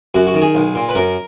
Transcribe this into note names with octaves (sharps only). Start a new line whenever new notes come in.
F#2 F#4
F#4
D#3
G#4
B1
A#2
B4
F#2 A#4